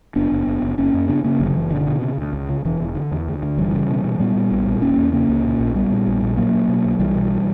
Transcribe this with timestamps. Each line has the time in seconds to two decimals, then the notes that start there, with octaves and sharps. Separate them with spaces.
0.16 F#1 B3 D4
0.32 F#1
0.47 F#1
0.63 F#1
0.78 G1 A#3 C#4
0.94 F#2
1.09 C#3 B3 D4
1.24 C#3 A#3 C#4
1.40 F#1 D3 F#3
1.55 F#1 E3
1.71 B2 D3
1.87 B2
2.02 C#3
2.18 D2
2.33 C#2
2.49 C#3
2.65 E1 E3
2.80 E1
2.95 D3
3.11 E2
3.27 D2
3.43 D3
3.57 F#1 E3 G3
3.74 C#3
3.89 B2
4.04 B2
4.19 A#2 G3 B3
4.36 A#2
4.52 A#1
4.67 A#2
4.82 E1 A#3 C#4
4.97 E2
5.13 C#3 A#3 C#4
5.29 C#2
5.45 A#2
5.59 A#1
5.75 A#2 G3 B3
5.91 A#2
6.07 A#1
6.22 A#2
6.37 A#2 F#3 A#3
6.53 A#2
6.69 B2
6.85 B1
6.99 B1 E3 G3
7.15 B2